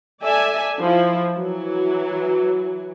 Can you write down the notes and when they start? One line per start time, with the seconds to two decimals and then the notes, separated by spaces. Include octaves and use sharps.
0.23 A4 D5 E5 G#5
0.80 F3 E4
1.37 E3 F#3